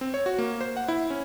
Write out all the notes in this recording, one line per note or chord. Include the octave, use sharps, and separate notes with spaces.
C4
C#5
F#4
A#3
C5
F#5
E4
C#4